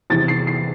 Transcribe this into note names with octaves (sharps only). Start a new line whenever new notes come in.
E2 C3 E3 A6
C7
C7